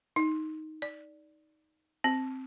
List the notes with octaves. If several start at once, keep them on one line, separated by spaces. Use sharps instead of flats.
D#4
D5
C4